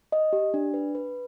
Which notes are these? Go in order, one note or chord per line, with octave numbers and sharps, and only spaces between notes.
D#5
G4
D4
B4
B4